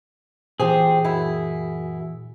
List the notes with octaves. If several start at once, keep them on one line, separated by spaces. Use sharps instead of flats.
A#2 E3 F3 C4 G4 G#4
F#2 E4